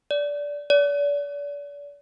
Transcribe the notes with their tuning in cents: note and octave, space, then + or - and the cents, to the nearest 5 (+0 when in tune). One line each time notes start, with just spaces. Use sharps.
D5 -15
D5 -35